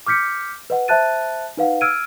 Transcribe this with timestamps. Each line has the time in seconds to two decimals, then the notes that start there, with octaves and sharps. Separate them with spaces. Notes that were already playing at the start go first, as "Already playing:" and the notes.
0.07 D6 F6 G6 B6 C#7
0.70 B4 D#5 F#5
0.88 C5 E5 A5 F#6 A6 D#7
1.57 D#4 B4 F5 F#5
1.81 E6 F6 G#6 D7 D#7